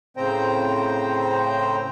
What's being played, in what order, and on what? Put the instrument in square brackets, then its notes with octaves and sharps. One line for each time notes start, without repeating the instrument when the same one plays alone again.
[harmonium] A2 C#3 C4 C5 G5 A#5